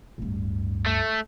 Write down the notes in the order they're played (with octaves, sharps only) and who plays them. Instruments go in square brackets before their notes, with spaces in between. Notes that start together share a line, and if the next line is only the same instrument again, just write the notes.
[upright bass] D1 G2
[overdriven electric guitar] A3